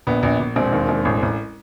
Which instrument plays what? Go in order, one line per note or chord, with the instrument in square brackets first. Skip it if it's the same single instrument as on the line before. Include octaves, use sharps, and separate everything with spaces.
[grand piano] A#1 B3
A#1
A#1
E1 C4
D#2
E1
A1
A1